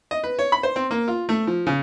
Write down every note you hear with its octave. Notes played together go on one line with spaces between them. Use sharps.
D#5
B4
C#5
B5
C5
C4
A#3
F4
A3
F3
C#3